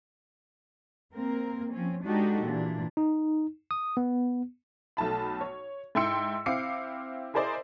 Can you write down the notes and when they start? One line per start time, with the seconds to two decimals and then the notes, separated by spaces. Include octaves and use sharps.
1.14 A#3 C4 A#4
1.73 F3 C4 C#4
2.04 G#3 D4 D#4 F#4 G4 A4
2.43 A#2 E3 D4
2.97 D#4
3.71 D#6
3.97 B3
4.97 B1 A3 A5 B5
5.41 C#5
5.95 G#2 E4 G5 C6 E6 C#7
6.46 C4 E4 F5 D6 C7 C#7
7.34 E4 G#4 A#4 C5 D5 D#5